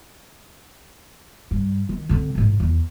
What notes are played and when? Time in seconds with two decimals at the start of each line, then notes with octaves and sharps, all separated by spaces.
1.51 G2
1.89 D#3
2.09 D3 C4
2.35 A1 G#2
2.60 E2